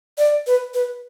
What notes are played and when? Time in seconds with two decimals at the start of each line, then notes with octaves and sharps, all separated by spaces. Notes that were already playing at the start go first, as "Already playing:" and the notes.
0.18 D5
0.47 B4
0.74 B4